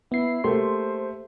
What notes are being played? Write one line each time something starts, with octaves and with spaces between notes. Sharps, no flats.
B3 E4 C7
A3 A#3 G4 C5 C6